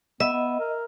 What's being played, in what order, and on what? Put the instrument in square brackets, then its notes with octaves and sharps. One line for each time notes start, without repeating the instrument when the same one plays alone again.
[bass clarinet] B3 [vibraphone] D#5 [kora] E5
[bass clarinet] B3
A#4